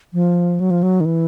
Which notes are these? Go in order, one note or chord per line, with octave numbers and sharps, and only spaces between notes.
F3
F#3
F3
F#3
D#3
E3